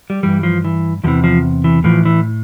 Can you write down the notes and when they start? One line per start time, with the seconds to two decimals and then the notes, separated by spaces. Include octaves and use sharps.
0.10 G3
0.23 G2 E3 G3
0.43 F3
0.65 E3
1.04 E2 C3 E3 F3
1.24 F3
1.64 E3
1.84 A2 E3 F3
2.05 E3